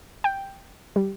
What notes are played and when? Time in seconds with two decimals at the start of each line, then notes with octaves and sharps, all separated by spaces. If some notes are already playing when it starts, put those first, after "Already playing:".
0.24 G5
0.96 G3